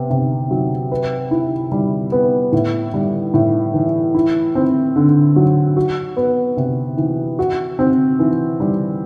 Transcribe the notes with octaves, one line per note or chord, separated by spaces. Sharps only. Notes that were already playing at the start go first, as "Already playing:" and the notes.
Already playing: C3 B3
C3
F#3
B4
E4
G3
B3
A2
G3
A2
E3
E4
C4
D3
F#3
F#4
B3
C3
E3
F#4
C4
E3
G3